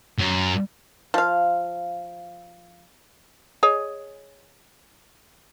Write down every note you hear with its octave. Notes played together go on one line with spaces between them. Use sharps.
F#2
F3 F5
G#4 C#5 D#5